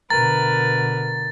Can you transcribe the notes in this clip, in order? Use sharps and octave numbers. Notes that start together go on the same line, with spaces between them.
B2 D3 A#4 B4 A#5 A6